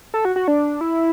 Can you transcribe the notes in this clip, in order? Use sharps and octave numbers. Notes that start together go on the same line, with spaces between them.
A4
F#4
F#4
D4
E4